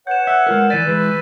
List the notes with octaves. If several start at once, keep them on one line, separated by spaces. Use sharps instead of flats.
B4 C#5 F#5 G6 E7
E5 E6 F#6
G#3 F4 A#4
E3 D5 A6 B6 D#7
E3 G#3 B4